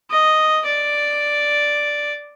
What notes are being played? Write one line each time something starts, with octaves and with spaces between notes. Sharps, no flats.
D#5
D5